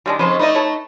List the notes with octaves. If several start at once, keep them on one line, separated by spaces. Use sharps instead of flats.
D#3 G3 G#3 D4
F2 C#3 C#4 B4 C5 C6
A3 D#4 B4 D5 D#5
A4 B4 C#5